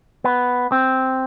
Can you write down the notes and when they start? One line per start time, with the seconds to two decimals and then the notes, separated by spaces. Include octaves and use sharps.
0.24 B3
0.72 C4